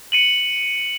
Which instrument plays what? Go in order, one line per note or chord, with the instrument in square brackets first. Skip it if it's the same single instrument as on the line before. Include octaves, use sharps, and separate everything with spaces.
[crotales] C#7 D#7 F#7